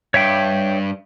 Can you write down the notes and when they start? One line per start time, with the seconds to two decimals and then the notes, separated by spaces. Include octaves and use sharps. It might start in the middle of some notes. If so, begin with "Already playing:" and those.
0.14 G2 C#5 E5 G5